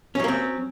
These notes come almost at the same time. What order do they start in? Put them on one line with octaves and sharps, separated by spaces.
C#4 F#3 A#3 C4